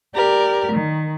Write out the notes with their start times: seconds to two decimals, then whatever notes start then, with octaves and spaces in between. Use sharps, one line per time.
0.15 G4 A#4 D5
0.72 D#3